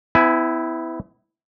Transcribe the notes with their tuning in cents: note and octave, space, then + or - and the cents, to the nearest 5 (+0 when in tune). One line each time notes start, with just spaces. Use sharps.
B3 +40 E4 -5 G#5 +15